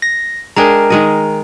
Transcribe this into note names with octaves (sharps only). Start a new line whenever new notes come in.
A#6
G#3 D4 G#4 A#4 G5 A#5
D#3 G#3 D#5